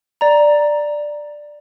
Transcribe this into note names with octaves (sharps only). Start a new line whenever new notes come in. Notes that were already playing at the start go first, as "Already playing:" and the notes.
D5 A#5